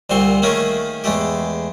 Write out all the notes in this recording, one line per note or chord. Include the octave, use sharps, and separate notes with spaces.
C2 A#2 D3 C4 C6 C#6
D#3 A3 A#3 C#4 G#4 A#4
E2 G#3 A3 G4